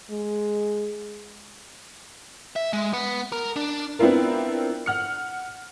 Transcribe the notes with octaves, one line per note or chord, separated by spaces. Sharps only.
G#3
E5
G#3
B3
A#4
D4
B3 C4 D4 E4 F4 A#4
F#5 F6 C#7